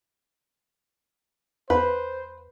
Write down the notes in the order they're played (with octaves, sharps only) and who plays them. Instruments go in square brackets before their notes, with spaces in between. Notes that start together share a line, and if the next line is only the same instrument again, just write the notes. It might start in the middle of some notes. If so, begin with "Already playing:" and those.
[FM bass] E2 [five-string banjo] B4 [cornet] C5